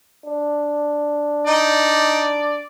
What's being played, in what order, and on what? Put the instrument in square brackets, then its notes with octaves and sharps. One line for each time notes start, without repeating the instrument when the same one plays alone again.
[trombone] D4
[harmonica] D#4 [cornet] D5